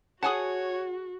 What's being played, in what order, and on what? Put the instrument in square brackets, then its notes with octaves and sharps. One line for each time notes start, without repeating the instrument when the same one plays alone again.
[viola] F#4 [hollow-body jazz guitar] G#4 G#5 A5 [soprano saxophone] C#5 [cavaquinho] F#5 D#6